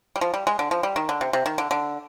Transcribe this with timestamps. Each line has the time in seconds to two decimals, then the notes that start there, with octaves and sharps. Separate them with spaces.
0.16 G3
0.21 F3
0.34 G3
0.47 G#3
0.59 D3
0.71 F3
0.83 G3
0.96 D#3
1.09 D3
1.21 C3
1.33 C3
1.46 D#3
1.58 D3
1.71 D3